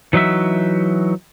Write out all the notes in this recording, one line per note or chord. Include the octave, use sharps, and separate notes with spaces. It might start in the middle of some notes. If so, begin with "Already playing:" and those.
E3 F#3 D#4 F#4 E5